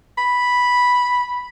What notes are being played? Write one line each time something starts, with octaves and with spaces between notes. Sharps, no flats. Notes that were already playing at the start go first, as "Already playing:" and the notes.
B5